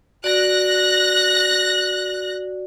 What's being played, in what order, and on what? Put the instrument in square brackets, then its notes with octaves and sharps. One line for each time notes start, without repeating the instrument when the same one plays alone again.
[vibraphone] F#4 D5 [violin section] F#6 A#6